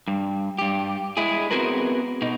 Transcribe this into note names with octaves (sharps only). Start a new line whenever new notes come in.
G2
G2 G4
G#3 E4 G#4
B3 C4 F#4 G#4 A#4 B4
B2 D#4